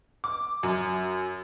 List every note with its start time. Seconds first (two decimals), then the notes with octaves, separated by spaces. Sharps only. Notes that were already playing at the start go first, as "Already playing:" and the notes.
0.24 D6
0.63 F#2